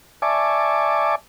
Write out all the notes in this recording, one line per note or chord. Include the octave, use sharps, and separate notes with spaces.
D5 E5 G#5 A5 C#6 D6